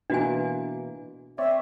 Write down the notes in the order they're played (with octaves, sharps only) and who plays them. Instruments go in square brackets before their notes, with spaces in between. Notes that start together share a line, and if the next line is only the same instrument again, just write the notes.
[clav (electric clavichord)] B2 E3 A#3 [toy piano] D4 F#4 G#5
[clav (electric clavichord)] C4 C#5 D5 [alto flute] E5